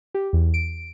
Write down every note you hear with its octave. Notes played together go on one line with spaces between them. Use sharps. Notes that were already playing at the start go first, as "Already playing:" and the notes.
G4
E2
D7